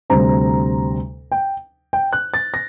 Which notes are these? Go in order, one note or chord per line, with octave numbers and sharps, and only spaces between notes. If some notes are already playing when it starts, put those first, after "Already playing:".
D2 C3 G3 C4 A#5
G5
G5
F#6
A6
A#6